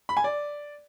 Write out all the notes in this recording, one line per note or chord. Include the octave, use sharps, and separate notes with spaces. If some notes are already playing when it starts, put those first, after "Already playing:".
B5
G#5
D5